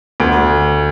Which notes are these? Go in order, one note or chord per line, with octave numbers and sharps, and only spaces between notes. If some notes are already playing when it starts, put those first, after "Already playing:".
D2